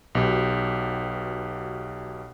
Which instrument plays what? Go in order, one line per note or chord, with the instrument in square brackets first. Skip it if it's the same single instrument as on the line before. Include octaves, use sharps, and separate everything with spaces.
[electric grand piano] B1 B2 G4